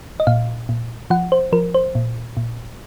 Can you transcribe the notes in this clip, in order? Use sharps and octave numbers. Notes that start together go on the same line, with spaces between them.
D#5
A#2 F5
A#2
F3 F#5
C5
F3 A#4
C5
A#2
A#2